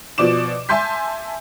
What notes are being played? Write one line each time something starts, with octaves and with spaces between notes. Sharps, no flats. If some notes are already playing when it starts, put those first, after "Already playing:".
B2 F3 D5 D6 E7
E5 G#5 A5 C6 G6 B6